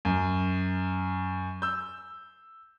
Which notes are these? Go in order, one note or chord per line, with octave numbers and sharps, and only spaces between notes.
F#2
E6 G6